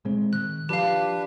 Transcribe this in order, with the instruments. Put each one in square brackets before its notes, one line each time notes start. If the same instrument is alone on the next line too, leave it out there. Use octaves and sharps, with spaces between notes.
[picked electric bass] A#2 G#3 C4
[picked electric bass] D#3 [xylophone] F#6
[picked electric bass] F3 [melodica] D4 B4 [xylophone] G4 F5